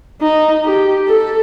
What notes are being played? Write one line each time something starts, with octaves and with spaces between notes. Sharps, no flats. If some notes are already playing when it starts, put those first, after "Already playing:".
D#4
G4
A4